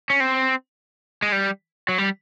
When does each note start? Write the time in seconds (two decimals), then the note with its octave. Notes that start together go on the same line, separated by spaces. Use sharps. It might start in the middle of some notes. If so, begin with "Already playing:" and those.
0.10 C#4
0.20 C4
1.22 G#3
1.32 G3
1.89 F#3
1.98 G3